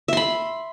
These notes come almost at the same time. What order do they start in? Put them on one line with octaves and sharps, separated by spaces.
E5 C6 B5